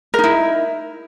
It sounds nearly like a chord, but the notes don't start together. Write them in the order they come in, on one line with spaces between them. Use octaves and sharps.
A#4 D#4 E4